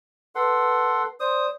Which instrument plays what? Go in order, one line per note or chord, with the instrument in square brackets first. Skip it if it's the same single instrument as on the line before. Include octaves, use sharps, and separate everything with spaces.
[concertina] A4 F#5 C6 [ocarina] B4
[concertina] C5 D#6 [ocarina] D5